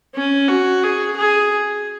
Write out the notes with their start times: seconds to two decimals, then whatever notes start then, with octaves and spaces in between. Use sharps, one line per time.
0.15 C#4
0.48 F#4
0.83 G#4
1.17 G#4